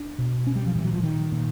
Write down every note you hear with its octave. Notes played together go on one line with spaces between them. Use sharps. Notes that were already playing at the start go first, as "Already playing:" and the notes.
Already playing: D4
B2
C#4
G3
F3
A#2 E3
F#3
F3
D#3
A#2